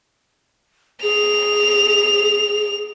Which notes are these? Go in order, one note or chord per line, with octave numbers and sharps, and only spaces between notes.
G#4 F7